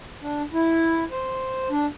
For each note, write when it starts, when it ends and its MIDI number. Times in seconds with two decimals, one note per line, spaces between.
0.22 0.43 62
0.53 1.04 64
1.11 1.69 72
1.70 1.86 62